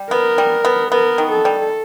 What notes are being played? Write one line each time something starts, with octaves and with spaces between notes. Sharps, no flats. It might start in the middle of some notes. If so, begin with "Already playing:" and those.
Already playing: G3
B3 A#4
G3
B3
B3 A#4
D#3
A4
G3